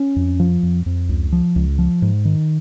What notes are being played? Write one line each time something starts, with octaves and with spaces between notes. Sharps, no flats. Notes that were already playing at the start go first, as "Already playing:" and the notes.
Already playing: C#4
F2
F3
F2
F2
C#2
F3
C#2
F3
G#2
D#3